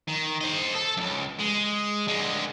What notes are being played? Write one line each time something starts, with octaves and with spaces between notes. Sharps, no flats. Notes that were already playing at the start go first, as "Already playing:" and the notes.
D#3
C5 D#5
A4
C#2 F#2
G#3
D3 G#3